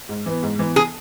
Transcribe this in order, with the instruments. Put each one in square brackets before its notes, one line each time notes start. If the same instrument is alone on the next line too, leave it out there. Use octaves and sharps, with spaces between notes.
[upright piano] G#2
E3 B3
G#2
E3 B3
[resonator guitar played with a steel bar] G#4